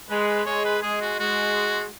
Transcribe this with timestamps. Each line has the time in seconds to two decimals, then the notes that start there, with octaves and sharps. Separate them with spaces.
0.10 G#3 B4
0.28 B4
0.46 G#3 C#5
0.65 B4
0.82 G#3 G#4
1.01 F#4
1.19 G#3 F#4